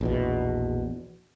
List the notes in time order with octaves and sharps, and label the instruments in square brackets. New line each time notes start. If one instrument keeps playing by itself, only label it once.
[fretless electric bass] A#1 E2 B2